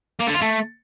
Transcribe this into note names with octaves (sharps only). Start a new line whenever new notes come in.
A#3
D3
F4
A3